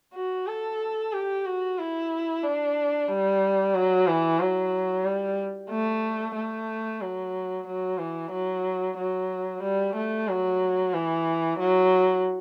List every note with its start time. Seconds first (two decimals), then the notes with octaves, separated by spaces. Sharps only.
0.14 F#4
0.47 A4
1.13 G4
1.45 F#4
1.78 E4
2.43 D4
3.08 G3
3.75 F#3
4.07 E3
4.40 F#3
5.05 G3
5.70 A3
6.36 A3
7.01 F#3
7.67 F#3
7.99 E3
8.32 F#3
8.98 F#3
9.63 G3
9.96 A3
10.29 F#3
10.94 E3
11.59 F#3